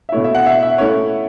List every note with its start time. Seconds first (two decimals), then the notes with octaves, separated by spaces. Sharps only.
0.09 E5
0.12 B2 A3 E4 C#5
0.24 E5
0.35 F#5
0.46 E5
0.63 E5
0.78 A3 C#4 E4 C#5